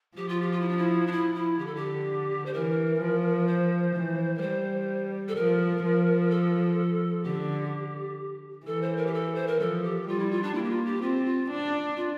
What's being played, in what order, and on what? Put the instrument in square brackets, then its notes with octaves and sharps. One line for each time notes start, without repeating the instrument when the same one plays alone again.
[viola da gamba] F3 [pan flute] G4
[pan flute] F4
G4
F4
E4
D4
E4
D4
E4
E4
[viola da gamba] D3 [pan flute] G4
[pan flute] A4
G4
C5
[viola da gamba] E3 [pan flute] A#4
[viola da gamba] F3
[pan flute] C5
[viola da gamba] E3
[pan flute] A#4
[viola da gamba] G3 [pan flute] C5
[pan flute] A4
[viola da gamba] F3 [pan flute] A#4
[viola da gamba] F3
[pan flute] A4
[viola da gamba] D3 [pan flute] G4
[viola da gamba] E3 [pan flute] A4
[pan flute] C5
A#4
G4
A4
C5
A#4
[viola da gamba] F3 [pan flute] A4
[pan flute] G4
[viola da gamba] G3 [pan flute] F4
[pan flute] E4
F4
D4
[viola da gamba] A#3 [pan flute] E4
[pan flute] G4
F4
G4
[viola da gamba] C4 [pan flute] F4
[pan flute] F4
[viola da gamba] D4
[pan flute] F4